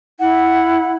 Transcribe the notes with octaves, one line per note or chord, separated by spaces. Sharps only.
E4 F#5